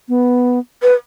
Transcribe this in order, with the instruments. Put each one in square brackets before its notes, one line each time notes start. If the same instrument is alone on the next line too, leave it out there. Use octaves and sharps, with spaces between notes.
[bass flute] B3
[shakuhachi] B4